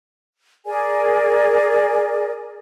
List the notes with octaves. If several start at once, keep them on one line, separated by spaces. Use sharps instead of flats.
G#4 A#4 D5 G#5